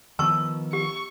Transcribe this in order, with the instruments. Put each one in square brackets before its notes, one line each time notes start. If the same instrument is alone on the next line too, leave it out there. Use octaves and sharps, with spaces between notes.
[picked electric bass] D#3 F3 B3 [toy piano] A5 C#6 [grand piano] E6
[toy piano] G4 [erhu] C#6